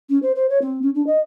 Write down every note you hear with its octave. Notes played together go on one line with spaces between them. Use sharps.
C#4
C5
C5
C#5
C4
C#4
D4
D#5